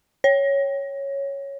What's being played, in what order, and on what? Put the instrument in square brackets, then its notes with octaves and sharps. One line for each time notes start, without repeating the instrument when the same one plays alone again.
[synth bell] C#5